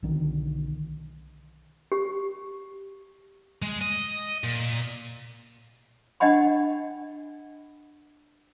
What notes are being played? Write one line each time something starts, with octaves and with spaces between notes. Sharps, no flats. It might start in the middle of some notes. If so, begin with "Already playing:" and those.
B1 D3 D#3
G4
G#3
D#5
A#2
D4 D#5 F#5 G5 B5